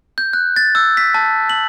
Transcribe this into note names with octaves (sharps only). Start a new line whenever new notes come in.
G6
F#6
A6
E6
B6
A5
F#7